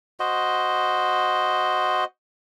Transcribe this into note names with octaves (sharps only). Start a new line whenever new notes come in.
F#4 C5 D#5